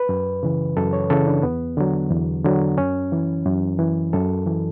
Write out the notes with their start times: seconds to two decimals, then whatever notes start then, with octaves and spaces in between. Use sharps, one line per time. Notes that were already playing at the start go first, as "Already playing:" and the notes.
Already playing: B4
0.09 F#2
0.43 C#3 E3
0.77 F#2 A4
0.93 C#5
1.10 C#3 E3 A4
1.27 D4
1.43 E2 B3
1.77 D3 F#3
2.11 E2
2.44 D3 F#3
2.78 F#2 C#4
3.12 E3
3.45 F#2
3.79 E3
4.13 F#2 A4
4.46 E3